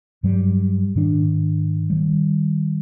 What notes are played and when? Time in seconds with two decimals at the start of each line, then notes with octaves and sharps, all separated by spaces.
0.23 G2 F#3 G3
0.95 G#2 D#3 D4
1.90 D#3 G3